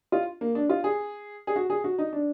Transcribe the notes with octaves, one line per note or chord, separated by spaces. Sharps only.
F4
A#3
D4
F4
G#4
G#4
F#4
G#4
F#4
D#4
D4